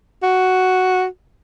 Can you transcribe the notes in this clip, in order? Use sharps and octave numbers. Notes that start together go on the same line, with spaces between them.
F#4